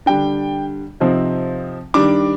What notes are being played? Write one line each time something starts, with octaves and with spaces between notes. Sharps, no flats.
D3 G3 D4 G5
C3 F3 C4 D#4
D#3 G3 D4 D6